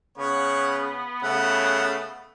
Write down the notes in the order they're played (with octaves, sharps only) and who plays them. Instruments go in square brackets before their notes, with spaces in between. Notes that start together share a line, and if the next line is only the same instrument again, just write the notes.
[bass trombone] C#3 [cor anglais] B3 [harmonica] C#5 F#5
[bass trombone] C#3 [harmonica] A3 [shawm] F#5